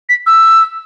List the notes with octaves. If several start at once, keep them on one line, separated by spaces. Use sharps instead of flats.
B6
E6